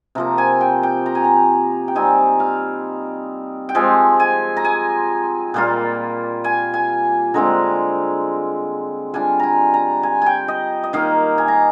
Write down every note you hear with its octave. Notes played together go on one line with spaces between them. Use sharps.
C3 F3 A#3 A#5
G#5
G5
G5
A#5
G#5
A#5
G5
G3 C4 D#4 G#5
F5
G5
F3 G#3 C4 G#5
G#5
A#5
G#5
A#2 G3 A#3 F4
G#5
G#5
D3 G#3 C4 F4 A#5
G3 D4 F4 G#5
G#5 A#5
A#5
G#5
G5 G#5
D#5
D#5
D#3 A#3 D#4 F5
G#5
A#5